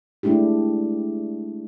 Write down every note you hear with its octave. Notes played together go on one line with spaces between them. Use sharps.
G#3 A3 D4 E4 G4